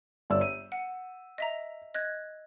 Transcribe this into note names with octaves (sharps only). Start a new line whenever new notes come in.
G1 D5 E6
D#7
F#5
D#5 E5 A#5
D#5 F#6 G#6